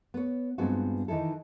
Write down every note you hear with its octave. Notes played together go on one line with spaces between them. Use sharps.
B3 C#5
G2 G#3 B3 C4 F4 F#4
D#3 E3 D#4 E4 A4